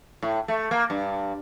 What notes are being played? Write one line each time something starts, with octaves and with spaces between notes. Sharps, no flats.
A2
A3
A#3
G2